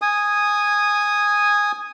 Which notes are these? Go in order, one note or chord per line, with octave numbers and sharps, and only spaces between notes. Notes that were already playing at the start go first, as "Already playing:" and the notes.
G#5 D#6